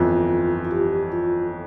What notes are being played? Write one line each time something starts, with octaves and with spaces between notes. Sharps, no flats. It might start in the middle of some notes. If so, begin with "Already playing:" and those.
Already playing: G1 F2 E3 F4
F4
G4
F4